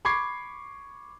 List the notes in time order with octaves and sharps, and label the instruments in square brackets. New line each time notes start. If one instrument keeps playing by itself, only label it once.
[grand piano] B5 C#6 D6 G#6 C7